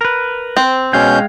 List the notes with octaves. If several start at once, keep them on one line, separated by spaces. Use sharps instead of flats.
A#4 B4
C4
B2 G#3 C#4 F5 G5 G6